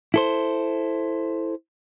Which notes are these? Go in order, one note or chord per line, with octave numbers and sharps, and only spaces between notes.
E4 A4 C5